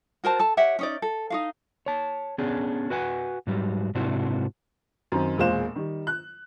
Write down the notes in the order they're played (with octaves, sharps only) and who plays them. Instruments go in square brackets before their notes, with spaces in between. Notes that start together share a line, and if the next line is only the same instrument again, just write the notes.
[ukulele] F#4 A#4 C5 A5
A4 A5
G4 C#5 E5 F#5
C#4 D#4 D5
A4
D#4 F#4 F5
[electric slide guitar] C#5 A5
B3 C#4 D4 G#4
F#4 B4 F#5 G#5
G#2 F#3 G3
G#2 C3 C4 D4 E4 F#4
[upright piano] F#2 D#3 C4
E1 A#2 G#3 C5 F5 E7
D#3 G3
F#6